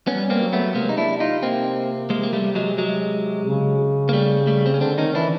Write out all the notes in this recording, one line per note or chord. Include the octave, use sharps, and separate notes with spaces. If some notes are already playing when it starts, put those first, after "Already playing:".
G3 B3 C#4
A#3 C4
F#3
A3 B3
C3 G#3 A#3
D#4
D4 E4
D#4 F4
A#3 C4
G#3 A#3
A#3
G3 A3
F#3 G#3
F#3 G#3
C#3
A#3
G3 A3
G3 A3
C4
C#4
D3 C4 D4
D#3 C#4 D#4
E3 D4 E4